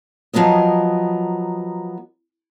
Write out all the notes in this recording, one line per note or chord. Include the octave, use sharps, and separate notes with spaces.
F3 F#3 B3 A#4 D#5